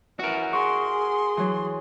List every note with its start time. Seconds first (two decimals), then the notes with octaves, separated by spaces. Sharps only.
0.19 E3 F#4 A#4
0.53 G#4 F#5 C6 C#6
1.37 E3 F#3